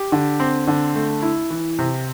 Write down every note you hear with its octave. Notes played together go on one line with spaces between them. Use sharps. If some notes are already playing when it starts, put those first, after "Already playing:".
Already playing: G4
D3
C4
D3
A3
E4
E3
C3